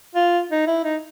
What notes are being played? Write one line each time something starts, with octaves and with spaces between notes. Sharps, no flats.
F4
D#4
E4
D#4